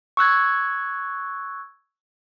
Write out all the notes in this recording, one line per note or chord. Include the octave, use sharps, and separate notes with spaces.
C#6 E6 F#6 G#6